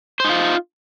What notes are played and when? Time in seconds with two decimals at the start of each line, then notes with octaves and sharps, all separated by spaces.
0.20 C5
0.24 D#4
0.29 F4